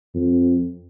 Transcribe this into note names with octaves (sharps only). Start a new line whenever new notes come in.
F2